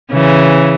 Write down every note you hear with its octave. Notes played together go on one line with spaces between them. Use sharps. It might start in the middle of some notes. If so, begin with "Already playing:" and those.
C#3 E3